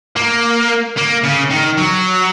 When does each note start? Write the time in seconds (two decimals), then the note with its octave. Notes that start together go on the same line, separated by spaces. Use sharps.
0.16 A#3
0.97 A#3
1.23 C#3
1.50 D#3
1.78 F#3